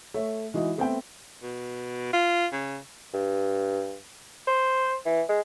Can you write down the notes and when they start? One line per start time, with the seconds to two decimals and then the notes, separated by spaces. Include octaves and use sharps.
0.14 A3 C#5 E5
0.54 E3 G#3 D#4 E4 F#4 G#4
0.77 A3 B3 C4 C5 E5 G5
1.43 B2
2.13 F4
2.52 C#3
3.13 G2
4.47 C5
5.05 E3
5.29 G#3